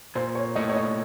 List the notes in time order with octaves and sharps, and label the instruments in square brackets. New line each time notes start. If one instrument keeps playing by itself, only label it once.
[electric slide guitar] A#2 [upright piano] C5
[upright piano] C#5
[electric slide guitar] A3 [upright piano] D#5
[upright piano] C#5
D#5